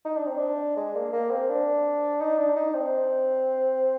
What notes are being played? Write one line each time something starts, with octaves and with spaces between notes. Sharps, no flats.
D#4
D4
C4
D4
G#3
A#3
A#3
C4
D4
D#4
D4
D#4
C4